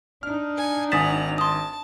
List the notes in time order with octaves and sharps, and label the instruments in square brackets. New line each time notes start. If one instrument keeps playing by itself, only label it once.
[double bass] D4 D#4 [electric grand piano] F6
[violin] G#5 C#7
[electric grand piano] G#1 A6 E7 [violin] F#5 F7 [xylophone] G#5 D#6 B6
[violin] A5 [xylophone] C6 D#6